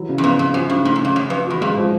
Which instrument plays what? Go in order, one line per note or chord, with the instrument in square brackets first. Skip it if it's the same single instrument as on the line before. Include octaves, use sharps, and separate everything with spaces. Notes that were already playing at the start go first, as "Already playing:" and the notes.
Already playing: [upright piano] E3 F#3
C#3
[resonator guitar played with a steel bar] E2
[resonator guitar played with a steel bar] F2 [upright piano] B3
[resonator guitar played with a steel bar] F2 [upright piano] C#3
[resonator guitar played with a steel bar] F#2 [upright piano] F3
[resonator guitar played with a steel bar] G2 [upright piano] C#3
[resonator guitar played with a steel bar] G#2 [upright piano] A3
[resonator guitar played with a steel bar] F#2
[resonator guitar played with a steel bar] F2 [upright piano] C#3
[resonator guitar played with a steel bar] F#2 [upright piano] C#4
[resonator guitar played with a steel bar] F2 [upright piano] B4
[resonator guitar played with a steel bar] E2 [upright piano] F#4
[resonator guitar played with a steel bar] F2 [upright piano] G#3
[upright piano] F3